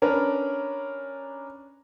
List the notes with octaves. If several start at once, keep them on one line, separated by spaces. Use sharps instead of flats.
C#4 D4 A#4 B4